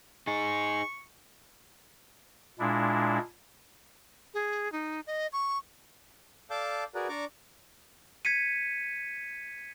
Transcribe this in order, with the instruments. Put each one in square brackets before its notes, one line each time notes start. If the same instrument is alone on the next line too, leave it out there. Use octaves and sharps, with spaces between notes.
[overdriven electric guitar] D#4 G#4 [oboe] C#6
[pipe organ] A#2 G#3 D4 E4
[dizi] G#4
D#4
D#5
C#6
[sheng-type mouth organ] A4 D5 F5 A5 D6 G6
F#4 G#4 A#4 B4 D5
D4 D5 A#5 C#6 D6
[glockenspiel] G#6 B6 C#7 D#7